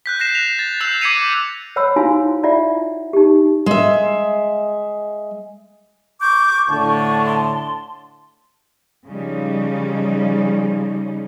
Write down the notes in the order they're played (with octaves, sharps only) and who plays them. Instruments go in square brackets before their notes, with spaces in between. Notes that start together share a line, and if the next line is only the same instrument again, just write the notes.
[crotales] F#6 G6 B6
F#6 G6 A#6 C7 E7
F7
A6
E6 G6 C7 F7
D6 G#6 B6 C#7 D#7 F7
[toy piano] C5 C#5 F#5 B5 C6 E6
D#4 E4 F#4 F5 G#5 C6
E4 F4 D5 E5 F#5
D#4 G4
[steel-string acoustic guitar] G#3 E5
[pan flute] C#6 [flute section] D6 G6
[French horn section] A2 D3 [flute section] A5
[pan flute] C6
[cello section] C#3 F3 G3 D#4